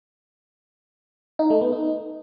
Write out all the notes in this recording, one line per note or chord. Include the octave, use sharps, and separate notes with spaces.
D#4
A3
B3
D#4